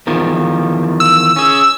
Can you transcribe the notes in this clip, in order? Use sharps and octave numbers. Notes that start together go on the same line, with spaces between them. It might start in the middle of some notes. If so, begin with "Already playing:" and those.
E2 D#3 F3
E6
C#4 G#4